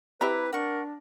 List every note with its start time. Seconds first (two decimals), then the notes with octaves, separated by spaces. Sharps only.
0.21 C4 E4 G4 B4 E5 A#5 B5 D6
0.53 D4 A#4 F#5 C#6